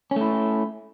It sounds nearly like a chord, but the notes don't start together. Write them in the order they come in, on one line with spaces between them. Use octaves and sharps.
C#4 A3 E4